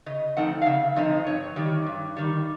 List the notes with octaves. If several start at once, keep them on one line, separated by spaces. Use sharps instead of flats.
C#3 D#5
F3 A3 C4 D#4 F#5
F5
C#3 E5
F3 A3 C4 D#4 D#5
G2 C#5
D#3 G3
G2
D#3 G3